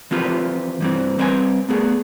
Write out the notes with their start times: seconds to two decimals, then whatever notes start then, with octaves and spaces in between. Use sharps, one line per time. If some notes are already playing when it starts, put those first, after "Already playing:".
0.11 E3 F3 C4 F4 G4 B4
0.80 G2 E3 C4
1.18 G3 C4 B4 C#5 G5 G#5
1.69 A3 B3 G#4